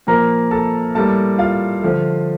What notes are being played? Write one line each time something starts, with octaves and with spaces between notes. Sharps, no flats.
A#2 F3 A#3 A#4 A#5
A4 A5
A2 G3 A#3 A4 A5
F4 F5
D3 F3 A3